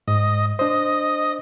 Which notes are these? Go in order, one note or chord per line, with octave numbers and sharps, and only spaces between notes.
G#2 D#5
D4 C5 D#5